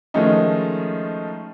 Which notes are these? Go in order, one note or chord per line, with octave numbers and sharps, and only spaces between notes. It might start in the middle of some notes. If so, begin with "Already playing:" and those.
D#3 F3 G#3 A3 C#4 D#4